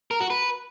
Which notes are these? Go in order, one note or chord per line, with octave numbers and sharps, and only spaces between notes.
A#4
F#4
B4